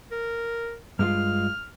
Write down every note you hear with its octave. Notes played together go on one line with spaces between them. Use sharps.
A#4
G2 G#3 F4 F6